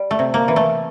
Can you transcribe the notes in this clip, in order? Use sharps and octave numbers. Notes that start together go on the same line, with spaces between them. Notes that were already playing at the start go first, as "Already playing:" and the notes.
Already playing: G3
A3
C3
A#3
E3
A3